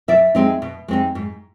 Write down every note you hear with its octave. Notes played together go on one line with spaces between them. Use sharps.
B2 D5 E5
G#3 C4 D#4
B2
G#3 C4 D#4
G#2